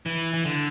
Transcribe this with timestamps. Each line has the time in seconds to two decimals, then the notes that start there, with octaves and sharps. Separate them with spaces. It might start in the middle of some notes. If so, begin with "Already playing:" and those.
0.06 E3
0.34 E3
0.45 D3